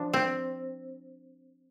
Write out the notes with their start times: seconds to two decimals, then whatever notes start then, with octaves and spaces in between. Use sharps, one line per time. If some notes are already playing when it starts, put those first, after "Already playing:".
Already playing: F3 D4
0.14 C4